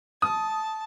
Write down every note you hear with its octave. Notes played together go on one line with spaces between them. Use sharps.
A5 D#6